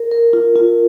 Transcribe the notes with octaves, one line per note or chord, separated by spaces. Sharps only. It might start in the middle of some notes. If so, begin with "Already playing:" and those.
Already playing: A#4
A#4
F4
F4